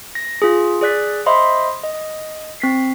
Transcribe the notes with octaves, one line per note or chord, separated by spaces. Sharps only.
A#6
F4 G#4
G#4 D5 F#6 B6
C5 D#5 E5 B5 C6
D#5
C4 B6 C7